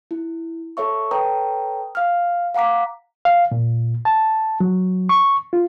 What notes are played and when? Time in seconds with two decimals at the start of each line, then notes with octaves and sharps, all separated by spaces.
0.11 E4
0.77 A4 C#5 E5 C#6
1.11 A4 B4 C#5 G5 A#5 D#6
1.95 F5 F6
2.55 F5 F#5 A#5 D6 B6
3.25 F5
3.52 A#2
4.05 A5
4.60 F#3
5.09 C#6
5.53 F4